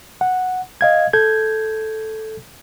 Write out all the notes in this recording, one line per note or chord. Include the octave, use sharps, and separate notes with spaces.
F#5
D#5 F5 G#6
A4 G6 G#6